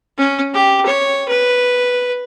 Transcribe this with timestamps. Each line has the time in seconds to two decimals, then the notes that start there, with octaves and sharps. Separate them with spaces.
0.18 C#4
0.54 G4
0.86 C#5
1.28 B4